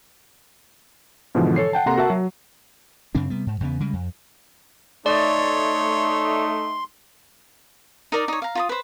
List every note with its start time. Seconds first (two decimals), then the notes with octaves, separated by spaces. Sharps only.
1.35 G#2 B2 D3 E3 F3
1.56 A4 C#5 C7
1.73 F#5 G5 A5
1.86 C3 A#3 A4 F#5 A#5 C6
1.97 F#4 A#4 E5 F#5 A5
2.10 F#3
3.15 F#2 C#3 C4 D4
3.30 C3 G3 B3
3.47 G#2
3.60 E2 C#3 B3
3.80 C#3 G3 G#3
3.93 F2
5.06 A3 D#4 C#5 D5 C6
8.12 D#4 A#4 D5
8.28 D#4 C#5
8.42 F5 A#5
8.55 F4 A#5 D#6
8.69 B4 C5